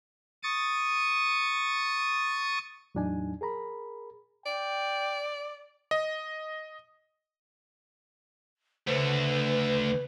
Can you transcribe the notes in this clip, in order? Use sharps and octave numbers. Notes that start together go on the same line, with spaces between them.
C#6 D#6 A6
E2 A2 F#3 D4 D#4 G#5
G#4 A#4 A#5 B5
D5 G5
D#5
D2 C#3 A3 B4 C5